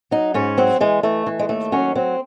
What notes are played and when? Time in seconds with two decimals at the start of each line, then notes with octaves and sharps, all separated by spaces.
0.11 F#3 D#4
0.34 G#2 C#4
0.58 F#3 C4
0.80 E3 G#3
1.03 E3 A3
1.26 E3
1.39 G#3
1.49 D#2 A3
1.72 F#3 C#4
1.95 F#3 C4